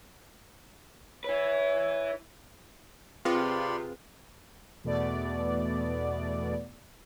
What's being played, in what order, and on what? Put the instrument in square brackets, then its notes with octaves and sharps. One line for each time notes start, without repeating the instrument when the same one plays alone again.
[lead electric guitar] E4 B4 [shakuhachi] C#5
[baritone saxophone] C3 [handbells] C4 G#4 B4 [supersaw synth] F4 [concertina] D5 B5 C6
[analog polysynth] E2 B2 A3 B3 D5